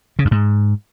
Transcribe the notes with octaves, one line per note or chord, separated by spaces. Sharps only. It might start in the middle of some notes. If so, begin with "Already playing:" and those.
C#3
F2
G#2